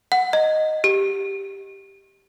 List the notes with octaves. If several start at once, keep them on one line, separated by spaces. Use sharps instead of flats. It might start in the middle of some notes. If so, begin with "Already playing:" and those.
F#5
D#5
G4